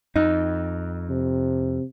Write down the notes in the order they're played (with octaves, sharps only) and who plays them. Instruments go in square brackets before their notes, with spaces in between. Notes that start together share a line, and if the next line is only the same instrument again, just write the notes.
[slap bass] F2 [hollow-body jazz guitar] D#4
[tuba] C3